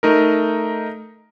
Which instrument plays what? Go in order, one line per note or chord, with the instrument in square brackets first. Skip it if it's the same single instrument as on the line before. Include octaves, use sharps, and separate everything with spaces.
[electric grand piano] A3 D#4 A#4